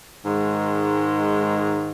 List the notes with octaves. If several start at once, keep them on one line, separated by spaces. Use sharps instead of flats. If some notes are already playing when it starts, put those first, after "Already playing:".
G#2 D#3 G#3